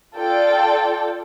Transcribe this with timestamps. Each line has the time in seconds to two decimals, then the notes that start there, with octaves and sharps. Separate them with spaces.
0.17 F4 A4 D5 G5